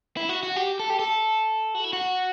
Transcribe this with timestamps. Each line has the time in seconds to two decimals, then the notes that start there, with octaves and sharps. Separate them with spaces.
0.17 E4
0.29 F#4
0.43 F#4
0.56 G4
0.80 A4
0.90 G4
0.99 A4
1.75 F#4
1.84 E4
1.93 F#4